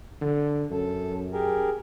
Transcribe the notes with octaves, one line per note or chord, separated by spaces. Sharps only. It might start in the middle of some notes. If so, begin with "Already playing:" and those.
D3
F#2 A4
G4 G#4 A#4